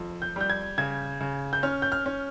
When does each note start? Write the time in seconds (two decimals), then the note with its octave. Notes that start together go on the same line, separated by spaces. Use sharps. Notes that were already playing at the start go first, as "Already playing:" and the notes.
Already playing: F2
0.22 G6
0.36 G3 G6
0.50 G#6
0.78 C#3 G#6
1.21 C#3
1.53 G6
1.63 C#4 F6
1.82 G6
1.92 F6
2.06 C#4